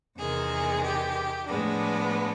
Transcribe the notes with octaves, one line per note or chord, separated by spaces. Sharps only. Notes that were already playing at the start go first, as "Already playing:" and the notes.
E2 C3 D#3 G#3 G#4
G4
A2 F3 G#3 B3 D4